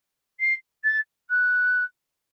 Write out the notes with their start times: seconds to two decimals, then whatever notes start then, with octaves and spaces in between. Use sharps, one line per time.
0.40 C7
0.84 A6
1.29 F#6